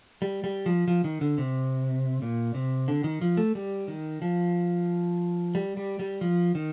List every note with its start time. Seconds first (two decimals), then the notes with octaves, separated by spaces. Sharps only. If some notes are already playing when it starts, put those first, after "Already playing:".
0.22 G3
0.44 G3
0.66 F3
0.88 F3
1.04 D#3
1.21 D3
1.38 C3
2.22 A#2
2.54 C3
2.88 D3
3.04 D#3
3.21 F3
3.37 A3
3.55 G3
3.88 D#3
4.22 F3
5.55 G3
5.77 G3
5.99 G3
6.21 F3
6.55 D#3